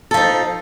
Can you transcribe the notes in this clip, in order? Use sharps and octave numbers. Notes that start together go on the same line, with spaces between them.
F3 D#4 A4